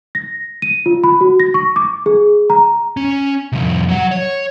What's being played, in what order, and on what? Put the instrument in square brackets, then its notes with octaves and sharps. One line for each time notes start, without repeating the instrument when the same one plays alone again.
[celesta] A#6
D#7
F4
B5
F#4
A#6
C#6
D6
G#4
A#5
[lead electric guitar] C#4
C2 F2
F#3 F#5
C#5